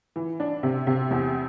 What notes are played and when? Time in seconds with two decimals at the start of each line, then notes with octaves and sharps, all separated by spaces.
0.16 E3
0.40 D4
0.63 C3
0.87 C3
1.11 E2